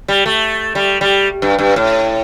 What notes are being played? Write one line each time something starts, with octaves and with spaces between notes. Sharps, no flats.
G3
A3
G3
G3
G2
G2
A2